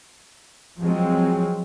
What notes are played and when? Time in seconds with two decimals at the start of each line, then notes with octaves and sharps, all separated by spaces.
0.80 F3 F#3 G#3 C4